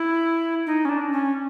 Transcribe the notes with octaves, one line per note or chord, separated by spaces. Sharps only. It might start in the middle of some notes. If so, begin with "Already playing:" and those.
Already playing: E4
D#4
C#4
D4
C#4